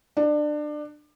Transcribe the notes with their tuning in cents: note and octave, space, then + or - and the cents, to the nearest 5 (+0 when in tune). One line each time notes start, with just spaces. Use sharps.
D4 +25